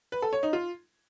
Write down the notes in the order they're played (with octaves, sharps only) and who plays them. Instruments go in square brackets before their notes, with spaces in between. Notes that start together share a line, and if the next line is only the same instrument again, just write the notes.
[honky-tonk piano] B4
A4
C#5
D#4
F4